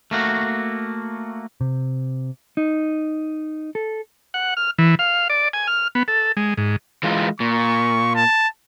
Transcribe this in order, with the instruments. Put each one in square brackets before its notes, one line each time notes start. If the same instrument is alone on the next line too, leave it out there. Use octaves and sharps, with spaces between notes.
[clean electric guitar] A3 A#3 F#4
[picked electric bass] C3
[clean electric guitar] D#4
A4
[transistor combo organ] F#5
F6
E3
F5
D5
G#5
F6
B3
A4
G#3
G#2
[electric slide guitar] E3 G#3 F4
[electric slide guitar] A#2 [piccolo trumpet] C#6
[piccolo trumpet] A5